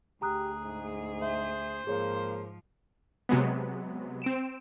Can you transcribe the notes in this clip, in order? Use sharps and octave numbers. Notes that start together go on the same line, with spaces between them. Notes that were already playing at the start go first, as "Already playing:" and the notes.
D2 G4 G#4 A#5 D#6 F#6
G#2
C5 E5
G#2 F3 A#3 G#4 C#5
C3 F#3 G#3 B3
C4 D7 E7